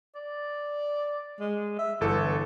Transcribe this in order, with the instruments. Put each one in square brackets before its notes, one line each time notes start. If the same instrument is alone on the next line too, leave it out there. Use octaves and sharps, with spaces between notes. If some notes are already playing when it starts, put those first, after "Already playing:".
[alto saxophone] D5
G#3
E5
[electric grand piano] G1 A4 [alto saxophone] E3